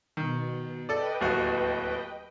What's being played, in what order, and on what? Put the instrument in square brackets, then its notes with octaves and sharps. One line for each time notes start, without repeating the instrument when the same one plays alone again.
[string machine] B2 [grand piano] D#3
[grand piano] A4 D5 [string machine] B4 D#5 G5
[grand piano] D1 D#2 F#4